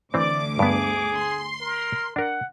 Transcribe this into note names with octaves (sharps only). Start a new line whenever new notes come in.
D2 E3 C4 D5 D6
G2 B3 G#4
C6
A#4
D4 A#4 F#5